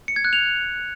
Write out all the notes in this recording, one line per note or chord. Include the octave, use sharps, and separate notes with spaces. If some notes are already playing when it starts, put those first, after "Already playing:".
C#7
G#6
F#6
F7